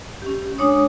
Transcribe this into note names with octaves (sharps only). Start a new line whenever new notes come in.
C#4 G4
G#3 D4 C#5 D#6